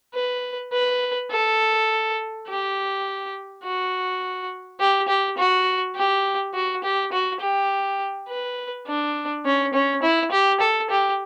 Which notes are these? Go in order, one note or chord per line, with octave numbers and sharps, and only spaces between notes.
B4
B4
A4
G4
F#4
G4
G4
F#4
G4
F#4
G4
F#4
G4
B4
D4
C#4
C#4
E4
G4
A4
G4